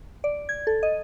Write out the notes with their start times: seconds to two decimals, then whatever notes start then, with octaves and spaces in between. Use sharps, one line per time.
0.24 D5
0.49 G#6
0.67 A4
0.83 D#5